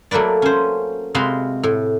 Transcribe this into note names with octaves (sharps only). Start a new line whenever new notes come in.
F#3 A3 A#3 B4 D5
C#4 C5
C3 G#3 F#4 F5 B5 C6
A2